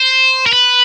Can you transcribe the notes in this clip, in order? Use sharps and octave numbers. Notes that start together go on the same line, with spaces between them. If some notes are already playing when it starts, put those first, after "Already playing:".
Already playing: C5
A#4
B4